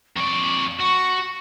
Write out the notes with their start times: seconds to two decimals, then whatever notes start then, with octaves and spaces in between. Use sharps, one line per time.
0.16 F2 D5 C#6
0.80 F#4 C#6